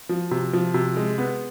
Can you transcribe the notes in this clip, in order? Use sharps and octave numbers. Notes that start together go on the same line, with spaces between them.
F3
C3
F3
C3
G#3
B3